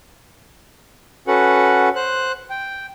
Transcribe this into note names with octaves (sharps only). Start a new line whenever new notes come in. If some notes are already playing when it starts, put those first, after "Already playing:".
C#4 F#4 A4 B4 F#5
C5 F#6
G5